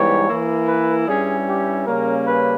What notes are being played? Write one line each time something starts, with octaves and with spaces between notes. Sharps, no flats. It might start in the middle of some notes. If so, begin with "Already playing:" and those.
Already playing: G#2 E3 G3 B3 C#5
E3 A#3 E4
B4
G2 G3 C#4 E4 G#4
G4
C#3 G3 A#3 C#4 A#4
B4